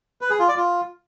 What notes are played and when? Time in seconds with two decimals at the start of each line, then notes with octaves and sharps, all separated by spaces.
0.21 B4
0.30 G#4
0.39 F4
0.48 D5
0.57 F4